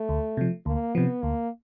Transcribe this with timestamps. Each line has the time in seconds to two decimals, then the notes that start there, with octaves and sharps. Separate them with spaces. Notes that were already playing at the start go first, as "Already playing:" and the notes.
Already playing: A3
0.09 D2
0.37 C3 F3
0.66 D2 A#3
0.95 C3 F3 B3
1.23 D2 A#3